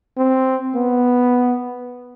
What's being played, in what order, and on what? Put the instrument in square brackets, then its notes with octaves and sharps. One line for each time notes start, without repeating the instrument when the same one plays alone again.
[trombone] C4
B3